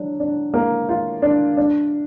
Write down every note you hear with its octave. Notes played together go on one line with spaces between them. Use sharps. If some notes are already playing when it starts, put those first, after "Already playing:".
Already playing: F#3 D4
D4
A#3
F4
D4
D4